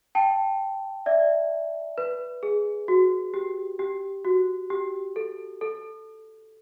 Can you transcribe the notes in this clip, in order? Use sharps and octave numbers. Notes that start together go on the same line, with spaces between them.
G5 A5
D5 E5
B4
G#4
F#4
G4
G4
F#4
G4
A4
A4